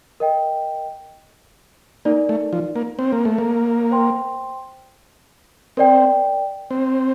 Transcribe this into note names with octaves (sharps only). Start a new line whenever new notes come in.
A#4 D#5 G5
A#3 D#4 A#4 D5
A3
F3
A#3
C4
A#3
A3
A#3
C5 G5 C6
C4 A#4 D5 G5
C4